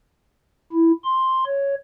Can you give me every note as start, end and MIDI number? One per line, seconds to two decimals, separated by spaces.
0.72 0.92 64
1.04 1.44 84
1.46 1.75 73